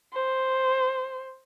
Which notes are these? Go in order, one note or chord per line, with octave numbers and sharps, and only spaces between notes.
C5